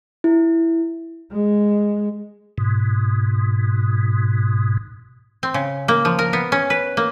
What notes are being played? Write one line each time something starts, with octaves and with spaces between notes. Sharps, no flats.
E4
G#3
G#2 B2
C4
C#3
A#3
F3
A#4
B3
C#4
B4
A#3